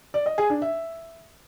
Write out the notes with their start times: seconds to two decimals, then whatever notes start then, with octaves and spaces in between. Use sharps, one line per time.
0.14 D5
0.26 D#5
0.38 G#4
0.50 D4
0.62 E5